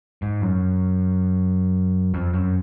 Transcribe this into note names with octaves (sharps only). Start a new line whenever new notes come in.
G#2
F#2
F2
F#2